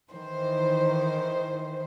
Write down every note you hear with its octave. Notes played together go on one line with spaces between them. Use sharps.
D#3 E3 C5